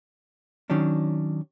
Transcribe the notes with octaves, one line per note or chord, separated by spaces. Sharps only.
D#3 F#3 C#4 D4